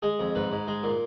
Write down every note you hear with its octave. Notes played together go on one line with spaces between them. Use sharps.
G#3 G#4
F2
G#2 B4
G#2
G#3
A#2